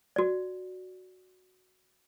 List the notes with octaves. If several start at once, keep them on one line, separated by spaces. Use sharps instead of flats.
F#4 D5